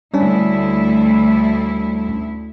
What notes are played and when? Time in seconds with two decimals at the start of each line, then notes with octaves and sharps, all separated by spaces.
0.14 D2 G3 C#4 D4 E4